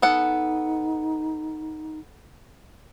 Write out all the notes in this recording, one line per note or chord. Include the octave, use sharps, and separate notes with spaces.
B3 D#4 A4 F#5